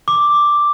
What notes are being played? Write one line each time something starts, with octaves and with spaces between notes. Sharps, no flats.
D6